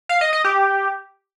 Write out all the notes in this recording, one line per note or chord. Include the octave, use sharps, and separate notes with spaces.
F5
D#5
D#5
G4